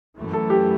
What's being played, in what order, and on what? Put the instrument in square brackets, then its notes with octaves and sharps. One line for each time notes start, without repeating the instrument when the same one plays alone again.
[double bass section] F#2 E3 A3
[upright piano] A4
G4